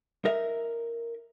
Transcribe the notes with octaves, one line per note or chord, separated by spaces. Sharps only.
D#4 A#4 E5